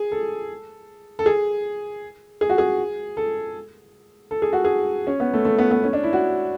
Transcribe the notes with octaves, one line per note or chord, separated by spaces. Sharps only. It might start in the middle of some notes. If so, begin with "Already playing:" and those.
Already playing: G#4
A4
A4
G#4
G#4
F#4
G#4
A4
A4
G#4
F#4
G#4
C#4
B3
A3
A3
B3
B3
C#4
D4
E4
F#4